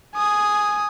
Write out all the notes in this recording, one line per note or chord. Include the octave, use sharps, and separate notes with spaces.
G#5 D#6